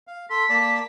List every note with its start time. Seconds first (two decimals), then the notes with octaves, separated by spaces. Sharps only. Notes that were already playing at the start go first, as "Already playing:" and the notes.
0.07 F5
0.30 A4 C6 B6
0.50 A#3 D5 A5